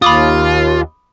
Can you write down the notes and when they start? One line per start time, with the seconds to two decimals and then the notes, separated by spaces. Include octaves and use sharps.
0.02 D#2 F4 B5 D6 D#6